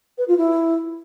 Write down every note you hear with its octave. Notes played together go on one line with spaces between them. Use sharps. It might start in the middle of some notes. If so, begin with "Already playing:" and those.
B4
F4
E4